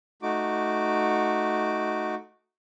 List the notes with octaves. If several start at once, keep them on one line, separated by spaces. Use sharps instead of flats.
A3 D#4 F#4 D6